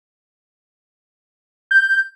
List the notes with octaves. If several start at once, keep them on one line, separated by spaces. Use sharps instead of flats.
G6